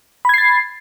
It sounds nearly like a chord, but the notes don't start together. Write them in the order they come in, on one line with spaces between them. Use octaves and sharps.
B5 G#6 C7 A6